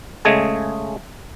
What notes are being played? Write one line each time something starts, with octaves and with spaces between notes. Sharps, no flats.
C#3 G#3 A3 G#4 D#5 G#5